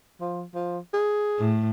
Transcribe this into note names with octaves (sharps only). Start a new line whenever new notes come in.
F3
F3
G#4
A2